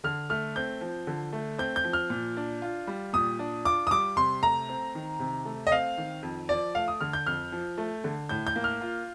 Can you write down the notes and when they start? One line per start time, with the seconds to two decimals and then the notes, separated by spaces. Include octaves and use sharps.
0.04 D3 F6
0.30 A3 F6
0.56 C4 G6
0.81 F3
1.07 D3
1.33 A3
1.58 C4 G6
1.76 G6
1.84 F3
1.93 F6
2.10 A#2
2.37 D4
2.62 F4
2.87 G3
3.13 A#2 D#6
3.39 D4
3.65 F4 D6
3.87 D#6
3.91 G3 D6
4.17 C3 C6
4.43 A3 A#5
4.69 C4
4.95 D#3
5.19 C3
5.45 A3
5.67 D#5
5.72 C4 F5
5.98 D#3
6.23 F2
6.49 F3 D5
6.75 A3 F5
6.88 D#6
7.01 D3 F6
7.13 G6
7.26 F2 F6
7.52 F3
7.78 A3
8.04 D3
8.29 A2 G6
8.47 G6
8.56 A#3
8.64 F6
8.81 F4